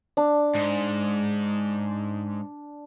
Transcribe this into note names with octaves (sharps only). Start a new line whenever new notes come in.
D4
G#2